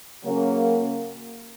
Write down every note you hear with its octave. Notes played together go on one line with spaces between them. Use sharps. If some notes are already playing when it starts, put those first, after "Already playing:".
C#3 F#3 A#3 C#4